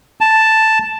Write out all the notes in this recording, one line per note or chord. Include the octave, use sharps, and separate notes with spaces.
A5